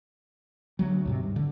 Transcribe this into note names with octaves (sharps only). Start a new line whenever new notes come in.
D2 F#3
D2 G#2 C3
G2
D1 D3